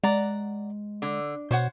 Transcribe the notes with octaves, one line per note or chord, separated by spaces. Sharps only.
G#3 D5 F#5 A#5
D3
B2 C5 C#5 F#5